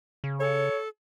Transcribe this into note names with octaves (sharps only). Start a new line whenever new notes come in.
C#3
A4 C#5